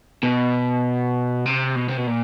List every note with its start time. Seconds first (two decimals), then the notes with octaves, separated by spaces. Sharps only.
0.23 B2
1.46 C3
1.76 B2
1.89 C3
1.97 B2
2.07 A#2